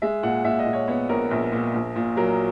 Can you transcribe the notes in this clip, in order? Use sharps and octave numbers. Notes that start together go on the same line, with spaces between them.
G#3 E5
A#2 F#5
A#2 E5
D#5
A#2
C#5
B3 C#5
A#1 A#4
A#1
A#2
A#1
A#2
F#3 A#4